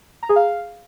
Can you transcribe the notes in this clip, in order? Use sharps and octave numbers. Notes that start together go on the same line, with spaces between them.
A#5
G#4
F5